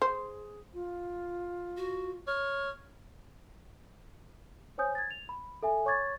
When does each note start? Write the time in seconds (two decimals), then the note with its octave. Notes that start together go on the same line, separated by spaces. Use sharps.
0.02 G#4 C5
0.73 F4
1.77 F#4
2.27 C#5 F6
4.78 C5 C#5 G#5 D#6 G6
4.95 G#6 A6
5.11 F7
5.29 B5
5.63 A4 E5 G#5
5.86 C#5 C#6 D6 G#6 A6